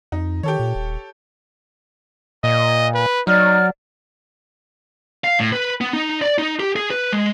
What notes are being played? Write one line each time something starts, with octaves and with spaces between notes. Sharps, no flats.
F2 D#4
D#3 G4 A4 C#5
A#2
D#1
A#2 D#5
B4
F#3 D#4 D5 F6
F5
A2
B4
B3
D#4
D5
D#4
G4
G#4
B4
G#3